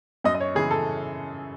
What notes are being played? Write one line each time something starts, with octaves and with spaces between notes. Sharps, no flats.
F#2 D#5
D#5
C#5
C#3 E3 G#4
A4